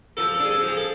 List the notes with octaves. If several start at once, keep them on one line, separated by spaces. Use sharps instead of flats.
F3 A4
A4
D4 G#4
A4
F3
G#4
A4